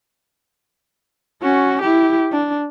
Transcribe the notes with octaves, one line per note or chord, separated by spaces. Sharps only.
C#4 F#4
E4 G4
D4